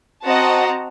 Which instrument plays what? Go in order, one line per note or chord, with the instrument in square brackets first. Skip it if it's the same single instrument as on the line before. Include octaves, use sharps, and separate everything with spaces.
[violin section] C4 F#4 D#5 F#5 A5 A#5